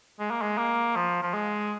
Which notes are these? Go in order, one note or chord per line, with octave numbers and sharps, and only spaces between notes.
G#3
A#3
G#3
A#3
F3
F3
G#3